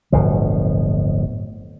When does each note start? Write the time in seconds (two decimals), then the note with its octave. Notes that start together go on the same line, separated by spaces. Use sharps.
0.12 D1 G1 B2 F3